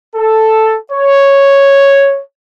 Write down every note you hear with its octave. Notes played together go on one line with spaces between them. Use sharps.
A4
C#5